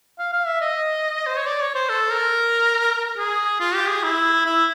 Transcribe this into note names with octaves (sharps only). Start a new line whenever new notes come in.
F5
F5
E5
D#5
C5
C#5
D5
C#5
C5
A4
A#4
G#4
F4
G4
G#4
E4
E4